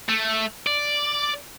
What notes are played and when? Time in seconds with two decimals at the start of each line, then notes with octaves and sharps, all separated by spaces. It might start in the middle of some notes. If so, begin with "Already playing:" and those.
0.09 A3
0.67 D5